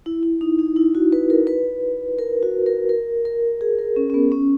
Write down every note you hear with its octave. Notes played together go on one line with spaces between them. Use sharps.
E4
E4
D#4
D#4
E4
F#4
B4
A#4
B4
A#4
F#4
A#4
A#4
A#4
G#4
A#4
C#4
C#4
B3
C#4